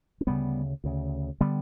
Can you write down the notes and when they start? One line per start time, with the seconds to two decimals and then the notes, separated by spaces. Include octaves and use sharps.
0.21 C#4
0.27 D2 C#3 G3 B3
0.84 D2 C#3
1.41 D3 G3 B3